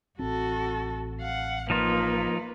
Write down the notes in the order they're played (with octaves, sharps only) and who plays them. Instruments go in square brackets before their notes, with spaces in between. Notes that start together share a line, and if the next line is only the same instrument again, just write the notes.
[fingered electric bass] A1 C4 [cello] F#4 A4
[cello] F5 F#5
[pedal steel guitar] F3 D#4 F4 [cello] A#3 B4